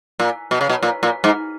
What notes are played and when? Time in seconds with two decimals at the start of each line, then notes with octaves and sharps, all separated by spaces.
0.20 A#2
0.51 B2
0.61 C#3
0.69 B2
0.83 A#2
1.03 A#2
1.24 G#2